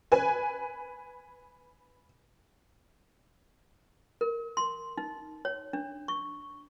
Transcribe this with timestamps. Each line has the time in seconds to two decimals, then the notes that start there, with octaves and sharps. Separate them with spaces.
0.12 B4 G#5
4.21 A#4
4.57 C6
4.98 D#4
5.45 C#5
5.73 D4
6.08 C#6